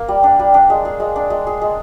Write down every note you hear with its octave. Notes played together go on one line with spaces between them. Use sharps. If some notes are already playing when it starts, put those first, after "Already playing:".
Already playing: A#3
G3
D4
G3
D4
G#3
G#4
G#3
D4
G#3
G#4
G#3